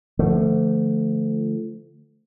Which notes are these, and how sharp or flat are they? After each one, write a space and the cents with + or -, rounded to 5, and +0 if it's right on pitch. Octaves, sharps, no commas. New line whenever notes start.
D3 +0 F3 -25 A3 +0